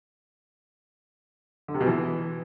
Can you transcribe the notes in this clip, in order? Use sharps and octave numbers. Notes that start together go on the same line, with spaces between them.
D3
C3
B2
E3